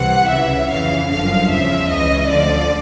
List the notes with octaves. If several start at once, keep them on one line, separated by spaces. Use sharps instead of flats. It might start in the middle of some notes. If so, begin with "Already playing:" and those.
Already playing: C2 C3 E3 F#5
C#2 C#3 E3 E5
F2 C#3 E3 F5
G1 F#2 D3 F3 F5
E2 C#3 F3 E5
C#2 C#3 E3 D#5
D2 D3 F3 D5